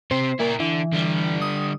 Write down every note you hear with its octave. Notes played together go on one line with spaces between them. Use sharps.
C3 C4 C5
A#2 E4 A#4
D3 E3
D3 G3
D#6